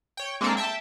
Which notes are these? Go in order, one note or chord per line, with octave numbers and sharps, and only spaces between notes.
C#5 G5
G#3 A#3 C4 D4 A4 A#4
E5 G5 A5